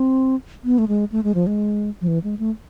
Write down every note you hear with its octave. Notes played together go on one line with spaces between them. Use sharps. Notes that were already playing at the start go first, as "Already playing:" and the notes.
Already playing: C4
B3
A3
G#3
A3
G#3
F3
G#3
F3
E3
G#3
A3